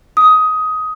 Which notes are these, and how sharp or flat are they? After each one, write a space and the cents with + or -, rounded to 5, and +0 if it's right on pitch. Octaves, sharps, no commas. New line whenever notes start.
D#6 +15